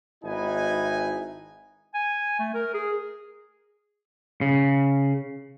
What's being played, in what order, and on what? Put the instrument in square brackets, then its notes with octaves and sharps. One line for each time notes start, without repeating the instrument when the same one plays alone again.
[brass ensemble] G#1 D#4 E4 B4 G#5
[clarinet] G#5
A3
A#4
G#4
[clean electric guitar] C#3